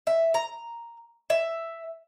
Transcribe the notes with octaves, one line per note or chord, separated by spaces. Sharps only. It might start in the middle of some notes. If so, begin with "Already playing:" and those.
E5
A#5
E5